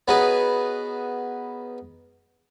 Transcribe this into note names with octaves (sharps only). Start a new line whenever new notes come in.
B3 C#4 D#4 F#4 G#4 B4